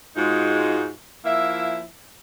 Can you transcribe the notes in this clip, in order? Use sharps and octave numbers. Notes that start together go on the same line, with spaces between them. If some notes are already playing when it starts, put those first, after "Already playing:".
G#2 G#3 D#4 F4 F#4
F3 A#3 E4 E5